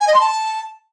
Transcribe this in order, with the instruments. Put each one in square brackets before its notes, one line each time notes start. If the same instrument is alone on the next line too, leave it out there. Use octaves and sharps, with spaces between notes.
[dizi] G#5
D#5
C6
A5